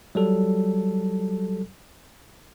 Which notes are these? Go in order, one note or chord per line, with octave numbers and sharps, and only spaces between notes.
F#3 G3 A4